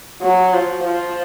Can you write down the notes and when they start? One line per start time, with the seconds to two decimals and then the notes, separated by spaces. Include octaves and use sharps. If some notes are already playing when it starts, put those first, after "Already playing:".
0.22 F#3
0.54 F3
0.85 F3